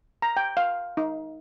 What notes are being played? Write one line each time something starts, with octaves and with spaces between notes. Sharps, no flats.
A#5
G5
F5
D#4